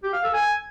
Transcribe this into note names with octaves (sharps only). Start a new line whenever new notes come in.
G4
F5
A4
G#5